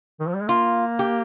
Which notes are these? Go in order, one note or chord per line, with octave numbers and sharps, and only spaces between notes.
D#3
F3
G3
G#3
A#3 F4
G4